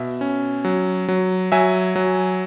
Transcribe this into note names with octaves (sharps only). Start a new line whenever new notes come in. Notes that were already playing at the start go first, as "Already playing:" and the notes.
Already playing: B2 E5
C#4
F#3
F#3
F#3 E5 G#5
F#3